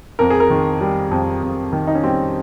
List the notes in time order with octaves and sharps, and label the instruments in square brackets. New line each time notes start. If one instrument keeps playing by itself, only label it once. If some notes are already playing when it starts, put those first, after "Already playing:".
[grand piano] F2 A#4
G#4
A#4
D#3
G3
F2
F2
D#3
D#4
C#4
G3 C4